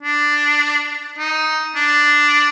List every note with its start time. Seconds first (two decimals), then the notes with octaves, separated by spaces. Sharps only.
0.03 D4
1.18 D#4
1.76 D4